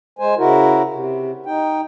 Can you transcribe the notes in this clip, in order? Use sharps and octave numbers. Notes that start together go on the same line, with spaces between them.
G#3 C5 G#5
C#3 E4 F#4 A#4
C3
D#4 G5